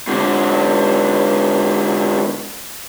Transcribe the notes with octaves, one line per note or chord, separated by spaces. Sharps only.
G#2 D3